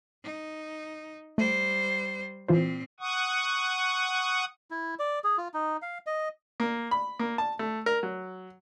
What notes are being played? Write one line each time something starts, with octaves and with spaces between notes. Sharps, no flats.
D#4
G3 A3 C5
A#2 E3 C4 F4 C5
F#5 C#6 D#6
E4
D5
G#4
F4
D#4
F5
D#5
A#3
B5
A#3
A5
A3
A#4
F#3